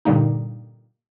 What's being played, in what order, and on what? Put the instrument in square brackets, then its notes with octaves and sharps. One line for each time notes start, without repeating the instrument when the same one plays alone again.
[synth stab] G2 A#2 D3 G3 A#3 D#4